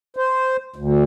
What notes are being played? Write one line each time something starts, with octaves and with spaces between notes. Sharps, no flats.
C5
D2